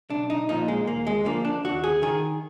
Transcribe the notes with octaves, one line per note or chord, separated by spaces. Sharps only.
B1 D4
D#4
A#2 F3 D#4
G#3
D#2 A#3
G#3
D3 F3 A#3
D4
D#2 F#4
G#4
D#3 G#4